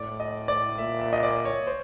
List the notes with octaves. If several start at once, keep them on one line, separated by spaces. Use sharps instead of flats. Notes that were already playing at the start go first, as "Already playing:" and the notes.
Already playing: A2 D5
D#5
D5
A#2 E5
E5
D#5
D5
C#5
C5